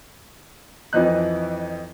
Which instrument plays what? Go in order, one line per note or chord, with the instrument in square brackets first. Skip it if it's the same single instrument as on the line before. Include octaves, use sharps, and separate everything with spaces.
[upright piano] F2 E3 F3 D#4 F#6